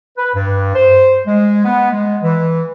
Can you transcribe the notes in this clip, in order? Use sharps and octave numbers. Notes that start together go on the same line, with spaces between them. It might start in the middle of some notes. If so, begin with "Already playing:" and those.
B4
G2
C5
G#3
B3
G#3
E3